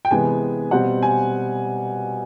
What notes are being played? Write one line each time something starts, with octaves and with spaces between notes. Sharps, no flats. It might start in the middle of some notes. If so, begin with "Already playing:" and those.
G5
C3 E3 G#3 B3 G#5
B2 G3 C4 F#5
G#5